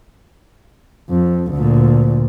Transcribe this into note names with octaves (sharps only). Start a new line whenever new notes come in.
F2
D2 A#2